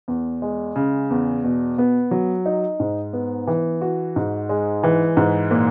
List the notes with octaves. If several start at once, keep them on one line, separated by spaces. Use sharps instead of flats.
E2
G#3
C#3
E2
B2
B3
F#3
D#4
G#2
B3
E3
F#4
G#2
G#3
E3
G#2
A#2